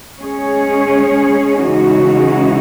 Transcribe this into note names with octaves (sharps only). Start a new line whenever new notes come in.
G#3 C#4 G#4 C#5
C#3 E3 G#3 D#4 F#4